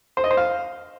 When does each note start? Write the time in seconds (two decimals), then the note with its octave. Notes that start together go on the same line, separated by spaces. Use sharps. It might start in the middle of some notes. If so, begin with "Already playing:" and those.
0.17 C5
0.24 D#5
0.31 C5
0.37 F5